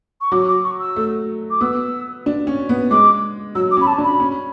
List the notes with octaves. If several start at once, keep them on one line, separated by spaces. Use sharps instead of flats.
C#6
F#3 D6
D6
C#6
E6
A3
D6
B3 E6
D4
C#4
B3
G#3 D6
F#3 E6
D6
C#4 B5
A5
D4
B5
C#4